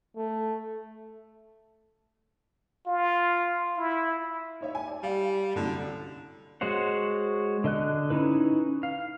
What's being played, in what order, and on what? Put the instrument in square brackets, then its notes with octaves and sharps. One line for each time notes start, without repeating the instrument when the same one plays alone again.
[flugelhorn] A3
[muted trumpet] F4
E4
[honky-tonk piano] D#4 C#5 E5
G#5
D5
[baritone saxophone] G3 [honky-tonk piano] F5
[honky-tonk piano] C2 F#2 [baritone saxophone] D3
[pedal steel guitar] G#3 F#4 C5 C#5 F#5
D3 D#5 F#6
C#4 D#4 E4 B4
F5